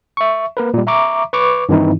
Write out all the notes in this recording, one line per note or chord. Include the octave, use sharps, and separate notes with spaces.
E5 C#6
A#3 A#4 B4
A#2 G3
E5 A#5 C#6 D6
B4 C#6 D6
G2 D#3 E3 C4 D#4 E4